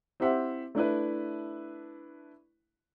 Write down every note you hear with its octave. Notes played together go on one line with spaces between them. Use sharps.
C4 E4 G4 C5 E5 F#5
A3 D4 E4 B4